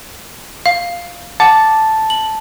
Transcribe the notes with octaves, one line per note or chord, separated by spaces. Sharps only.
F5
F#5 A5 D6
F#7